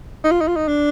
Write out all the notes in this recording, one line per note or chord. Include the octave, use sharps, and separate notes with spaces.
D#4
F4
D#4
F4
D#4
D4